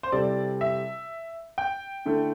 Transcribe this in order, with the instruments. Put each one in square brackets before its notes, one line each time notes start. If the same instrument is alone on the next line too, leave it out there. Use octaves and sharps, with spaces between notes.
[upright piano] C5
[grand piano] C3 G3 C4 E4 A4 [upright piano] D5
[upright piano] E5
G5
[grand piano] D3 A3 E4 A4